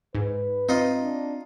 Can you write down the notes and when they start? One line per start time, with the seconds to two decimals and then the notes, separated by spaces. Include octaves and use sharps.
0.15 G#2 B4
0.69 C4 D#4 F4 D#5
1.00 D4